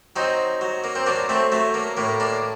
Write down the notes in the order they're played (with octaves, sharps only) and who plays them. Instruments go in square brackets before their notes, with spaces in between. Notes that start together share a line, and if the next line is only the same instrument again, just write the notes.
[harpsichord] F#3 C4 D#4
F#3
A#3
C4
F#3 A#3 D4
A3 C4
F#3 A3
A#3
A2 A#3
A#3 D4